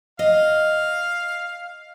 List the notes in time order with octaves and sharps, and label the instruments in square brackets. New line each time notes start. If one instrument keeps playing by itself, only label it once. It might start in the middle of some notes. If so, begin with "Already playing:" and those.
[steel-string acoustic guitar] D#5 [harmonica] F5